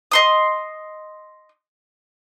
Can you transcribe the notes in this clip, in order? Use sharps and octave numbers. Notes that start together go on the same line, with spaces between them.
D#5 C6 D#6